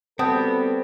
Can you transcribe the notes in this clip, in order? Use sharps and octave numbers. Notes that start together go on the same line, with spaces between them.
G3 B3 C4 F#4 A4 A5 D#6 G6